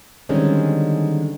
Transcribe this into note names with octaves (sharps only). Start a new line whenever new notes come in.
D3 D#3 G3 G#3 C4 C#4